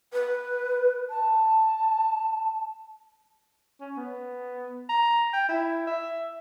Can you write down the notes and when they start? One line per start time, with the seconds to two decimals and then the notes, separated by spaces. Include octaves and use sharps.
0.13 B4
1.10 A5
3.81 C#4
3.97 B3
4.89 A#5
5.33 G5
5.49 E4
5.87 E5